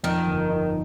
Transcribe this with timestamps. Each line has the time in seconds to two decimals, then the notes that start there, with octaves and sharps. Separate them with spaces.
0.04 F2 D#3
0.27 G1
0.50 D#4